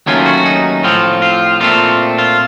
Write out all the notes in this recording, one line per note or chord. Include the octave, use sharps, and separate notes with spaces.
D#2 D#3 F#3 A3 C#4 F4
F#4
D#4
A2 F3 C4 F4
F4
A#2 A3 C4 F4
F4